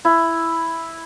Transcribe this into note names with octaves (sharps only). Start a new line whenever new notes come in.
E4